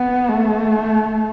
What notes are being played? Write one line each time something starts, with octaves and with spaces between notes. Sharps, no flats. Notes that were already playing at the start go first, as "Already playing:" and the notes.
Already playing: B3
A3